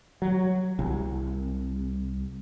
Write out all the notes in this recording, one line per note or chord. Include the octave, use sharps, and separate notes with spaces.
F#3
C2